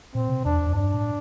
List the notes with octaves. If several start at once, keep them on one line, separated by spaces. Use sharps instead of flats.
A#2 C4
C3
E2 D4
F2
G2 D4
A2